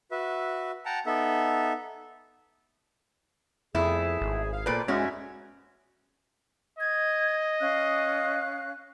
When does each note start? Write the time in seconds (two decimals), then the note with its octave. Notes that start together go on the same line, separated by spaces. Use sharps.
0.11 F#4 B4 E5
0.86 F#5 G5 A5 A#5
1.06 B3 D#4 A4 E5
3.75 F2 A3 B3 E4 G#4
4.21 G#1
4.52 F5
4.66 A#2 A4 B4 C5 D5
4.88 F#2 G#3 C#4 D#4 F#4 E5
6.79 D#5 G#6
7.60 C#4 F5 F#6